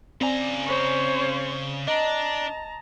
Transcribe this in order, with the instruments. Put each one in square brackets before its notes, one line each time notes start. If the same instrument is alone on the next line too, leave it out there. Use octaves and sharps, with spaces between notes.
[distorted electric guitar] C#3 A#5 [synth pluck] C4 D5 G#5
[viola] C5 C#5
[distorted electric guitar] D4 [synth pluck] D#5 [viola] A5 A#5